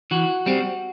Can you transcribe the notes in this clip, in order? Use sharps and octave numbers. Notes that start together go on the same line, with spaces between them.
E3 F#4
G3 C4